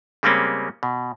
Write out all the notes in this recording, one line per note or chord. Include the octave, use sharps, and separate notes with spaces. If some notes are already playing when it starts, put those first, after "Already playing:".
C#3 G3 G#3 A#3 C4 C#4
B2